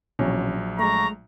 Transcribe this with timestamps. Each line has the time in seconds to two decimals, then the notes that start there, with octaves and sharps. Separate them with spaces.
0.19 A#1 B2 E3 F#3 C#4
0.79 G#3 A3 A#5 C#6